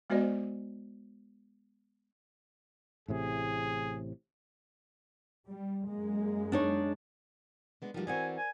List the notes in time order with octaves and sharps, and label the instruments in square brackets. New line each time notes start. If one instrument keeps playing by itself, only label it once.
[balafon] G#3 B3 F#4 C5 D5 D#5
[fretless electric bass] A1 A2 C3 [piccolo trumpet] G#4
[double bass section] G3
F#2 G#3 A#3
[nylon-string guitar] D4 D#4 C#5
[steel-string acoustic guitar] G#3 B3 D4
[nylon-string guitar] D#3 G3 [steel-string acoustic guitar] F3 F4 F#4
[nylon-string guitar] E3 C4 F#4 [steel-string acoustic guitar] A#4 D5 [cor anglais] G#5
[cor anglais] G#5